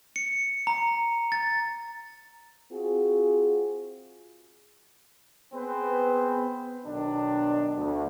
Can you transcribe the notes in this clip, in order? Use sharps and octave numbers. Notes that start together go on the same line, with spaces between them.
C#7
A#5
A6
C4 F4 F#4 G#4
B3 C4 G#4 B4 C5
B1 D#3 D4
D2